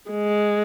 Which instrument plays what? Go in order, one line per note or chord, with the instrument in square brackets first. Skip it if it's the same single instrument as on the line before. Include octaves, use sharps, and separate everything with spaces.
[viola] G#3